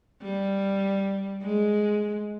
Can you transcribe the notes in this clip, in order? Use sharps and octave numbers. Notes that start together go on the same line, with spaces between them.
G3
G#3